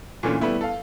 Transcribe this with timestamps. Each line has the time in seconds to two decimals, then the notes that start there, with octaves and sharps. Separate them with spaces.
0.23 A#2 D3 E3 A3 C#4
0.41 G3 A3 B3 E4
0.61 A4 F5